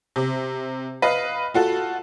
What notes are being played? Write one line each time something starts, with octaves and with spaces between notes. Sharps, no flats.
C3
B4 D#5 F5
F4 F#4 A4